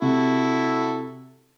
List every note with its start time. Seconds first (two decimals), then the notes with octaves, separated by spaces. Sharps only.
0.02 C3 E4 F#4 A4